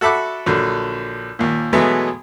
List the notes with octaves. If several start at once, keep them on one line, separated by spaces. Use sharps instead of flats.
F#4 A4 E5 B5 D6 F#6
A#1 D3 F#3
D#2 A#2
B2 E3 F#3 G#3 A3 B3